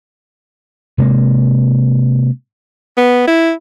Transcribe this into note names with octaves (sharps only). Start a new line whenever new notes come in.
C3 G#3 A#3
B3
E4